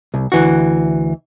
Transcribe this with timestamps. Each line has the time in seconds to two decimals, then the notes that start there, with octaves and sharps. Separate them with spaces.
0.14 C2
0.32 D2 E3 F#4